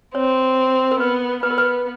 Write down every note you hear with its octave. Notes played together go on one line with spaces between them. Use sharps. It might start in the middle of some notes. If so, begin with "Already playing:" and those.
C4 C#5
A#4
B3 B4
B3 B4
A#4
B4